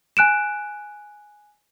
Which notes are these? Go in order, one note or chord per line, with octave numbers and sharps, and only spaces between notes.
G#5 F#6 D7 E7